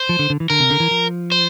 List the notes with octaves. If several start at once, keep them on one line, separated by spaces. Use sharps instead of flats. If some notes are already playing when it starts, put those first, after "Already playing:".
Already playing: C5
F3
D3
D3
E3
D3 A#4
C3
D3
E3
F3
C5